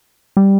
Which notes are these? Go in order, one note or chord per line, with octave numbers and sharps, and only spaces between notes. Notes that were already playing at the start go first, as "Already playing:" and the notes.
G3